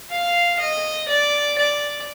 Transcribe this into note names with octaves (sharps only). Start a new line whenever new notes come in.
F5
D#5
D5
D5